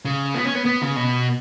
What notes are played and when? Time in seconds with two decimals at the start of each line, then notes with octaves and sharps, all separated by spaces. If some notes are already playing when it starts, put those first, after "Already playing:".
0.05 C#3
0.35 B3
0.45 C#4
0.55 B3
0.65 B3
0.82 C#3
0.96 B2